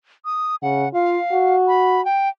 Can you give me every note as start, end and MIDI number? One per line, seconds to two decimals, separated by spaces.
0.25 0.56 87
0.62 0.86 49
0.62 0.89 78
0.94 1.18 65
0.94 1.56 77
1.32 2.02 66
1.68 2.04 83
2.05 2.29 79